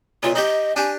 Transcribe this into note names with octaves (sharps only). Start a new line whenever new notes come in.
B1 A#2 F4
D#4 G4 D#5
D4 G4 G#5